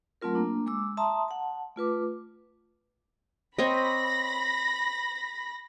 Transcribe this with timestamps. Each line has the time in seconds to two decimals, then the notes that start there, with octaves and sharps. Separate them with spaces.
0.21 F#3 A3 C4 F4 A#4
0.35 A#3 D4
0.66 G#3 D6 E6
0.97 E5 A5 A#5 C6 D#6
1.28 F#5 A5
1.76 A3 F4 B4 D6
3.59 C4 C#5 D#5 B5 A#6